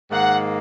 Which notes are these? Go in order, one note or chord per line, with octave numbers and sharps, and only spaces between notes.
G#2 D#3 A#3 F#5